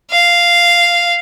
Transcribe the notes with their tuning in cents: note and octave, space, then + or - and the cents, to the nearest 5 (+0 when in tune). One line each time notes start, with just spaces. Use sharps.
F5 -5